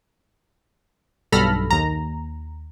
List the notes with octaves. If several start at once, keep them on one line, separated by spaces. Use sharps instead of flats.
B1 G2 A4 B5 F6 A#6
D#2 A#5